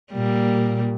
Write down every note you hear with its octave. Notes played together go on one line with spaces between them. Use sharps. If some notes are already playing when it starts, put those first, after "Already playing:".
A#2 G3 A#3